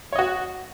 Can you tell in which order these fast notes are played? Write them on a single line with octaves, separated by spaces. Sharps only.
C#5 D#5 F#4